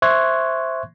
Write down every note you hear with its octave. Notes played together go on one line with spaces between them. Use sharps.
C5 E5 C6 C#6 F#6 G#6